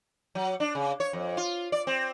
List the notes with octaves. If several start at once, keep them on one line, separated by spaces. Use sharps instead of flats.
F#3
D4
C#3
C#5
F2
F4
D5
C4